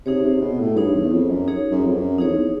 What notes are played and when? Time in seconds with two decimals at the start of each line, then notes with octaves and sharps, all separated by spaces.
0.06 C3 D#4 G#4 C#5
0.24 C3
0.41 B2
0.59 A2
0.77 G2 D#4 G#4 C#5
0.95 E2
1.12 F2
1.30 F#2
1.48 D#4 G#4 C#5
1.71 F#2
1.85 F2
1.95 F#2
2.18 F2 D#4 G#4 C#5
2.28 E2